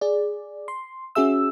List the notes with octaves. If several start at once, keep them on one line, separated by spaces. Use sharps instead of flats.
G#4 D5
C6
C#4 F#4 G#4 E5 E6